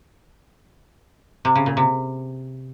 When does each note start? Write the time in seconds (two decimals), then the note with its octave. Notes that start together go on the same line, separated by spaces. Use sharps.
1.45 C3
1.55 C#3
1.66 A#2
1.77 C3